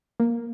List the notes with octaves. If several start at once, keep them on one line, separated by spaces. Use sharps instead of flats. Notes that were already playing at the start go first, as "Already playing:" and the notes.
A#3